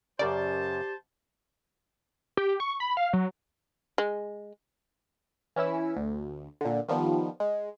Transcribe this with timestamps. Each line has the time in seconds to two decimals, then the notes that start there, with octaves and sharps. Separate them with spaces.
0.19 F#2 C#3 G4 A#4 C5 D5 A5
2.37 G4
2.60 C#6
2.80 B5
2.97 F5
3.13 F#3
3.98 G#3
5.56 E3 C#4 E4 E6
5.96 D2
6.61 A#2 D3
6.88 D#3 F3 G3 B3
7.40 G#3